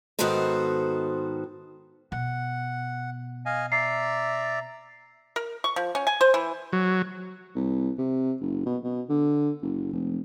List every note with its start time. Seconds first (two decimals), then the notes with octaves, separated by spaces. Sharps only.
0.19 G#2 D#3 B3 F#4 A4 C5
2.12 B2 F#5
3.46 D#5 F5 G#5
3.72 D5 E5 A#5 C7
5.36 A#4
5.64 C#6
5.76 F3
5.95 C#4
6.07 G#5
6.21 C5
6.34 E3
6.73 F#3
7.55 C2
7.98 C3
8.41 F#1
8.66 B2
8.84 B2
9.09 D3
9.62 F#1
9.92 F1